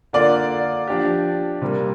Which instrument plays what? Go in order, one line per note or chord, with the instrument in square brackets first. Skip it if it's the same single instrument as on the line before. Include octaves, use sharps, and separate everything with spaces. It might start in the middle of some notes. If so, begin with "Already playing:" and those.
[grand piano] D3 A#3 F4 [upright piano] D5
[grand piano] F3 D4 G4
C3 G3 A#3